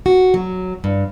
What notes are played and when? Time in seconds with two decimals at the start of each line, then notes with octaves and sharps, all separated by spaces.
0.06 F#4
0.34 F#3
0.84 G2